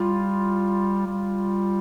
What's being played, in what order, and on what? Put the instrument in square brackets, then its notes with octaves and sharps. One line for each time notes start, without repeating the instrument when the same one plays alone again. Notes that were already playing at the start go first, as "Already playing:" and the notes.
Already playing: [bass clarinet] G3 [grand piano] F4
[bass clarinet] G3